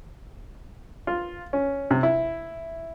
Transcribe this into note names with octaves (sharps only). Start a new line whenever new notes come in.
F4
C#4
C3
E4